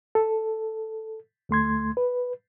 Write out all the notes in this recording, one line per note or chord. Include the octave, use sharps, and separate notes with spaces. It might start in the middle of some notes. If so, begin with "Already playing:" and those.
A4
D2 A3 C6 G#6
B4